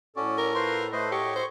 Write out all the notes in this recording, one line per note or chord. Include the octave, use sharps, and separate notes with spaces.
A2 C#4 F#4 A4 D5
A#4
F4 B4 C5 C6
A3 B4 C5 D#5
F#4 G4 C#5 D#5 C#6
C5